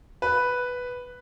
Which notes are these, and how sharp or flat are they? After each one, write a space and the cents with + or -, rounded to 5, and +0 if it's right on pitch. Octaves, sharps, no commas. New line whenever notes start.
B4 +0